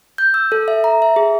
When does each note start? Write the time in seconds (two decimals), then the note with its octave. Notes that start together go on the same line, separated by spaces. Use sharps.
0.18 G6
0.34 E6
0.52 A4
0.68 E5
0.84 A#5
1.02 E5
1.16 G#4